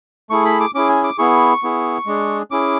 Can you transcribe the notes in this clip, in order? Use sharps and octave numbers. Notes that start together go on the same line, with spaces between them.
A3 E4 G#4 C#6
B5
D6
C#4 E4 G#4 D6
G#5
D6
B3 E4 G#4 C#6
B3 E4 G#4
G#3 D4 G#4
C#4 E4 G#4 D6